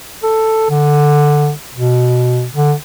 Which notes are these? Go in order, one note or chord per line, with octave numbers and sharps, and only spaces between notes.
A4
D3
B2
D3